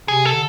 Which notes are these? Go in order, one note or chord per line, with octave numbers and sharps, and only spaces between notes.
C3 G#4
A4
D3